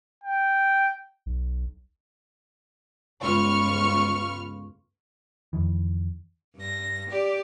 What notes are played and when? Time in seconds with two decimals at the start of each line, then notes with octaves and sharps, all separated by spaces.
0.24 G5
1.26 B1
3.22 G1 C#2 F4 B4 C#6 F6
5.53 F2 D#3 E3
6.55 G2 A#6
7.10 G4 D5